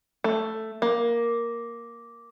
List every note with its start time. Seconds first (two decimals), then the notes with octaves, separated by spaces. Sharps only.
0.24 A3
0.82 A#3